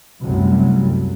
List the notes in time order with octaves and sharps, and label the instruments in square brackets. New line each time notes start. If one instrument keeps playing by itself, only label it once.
[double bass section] C2 F#2 C3 F#3 G3 A3